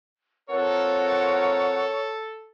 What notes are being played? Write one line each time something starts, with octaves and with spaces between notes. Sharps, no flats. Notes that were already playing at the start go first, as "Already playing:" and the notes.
C4 F4 A4 A#4 C#5 F#5